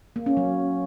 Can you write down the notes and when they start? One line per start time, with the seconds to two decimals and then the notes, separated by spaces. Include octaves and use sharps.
0.16 A#3
0.26 C#4
0.37 F#3